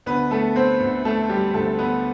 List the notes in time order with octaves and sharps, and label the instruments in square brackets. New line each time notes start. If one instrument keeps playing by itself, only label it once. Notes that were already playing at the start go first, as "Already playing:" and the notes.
[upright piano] D2 D3 B3 B4
A3 A4
C4 C5
D2 D3
A3 A4
G3 G4
D2 D3 A3 A4
B3 B4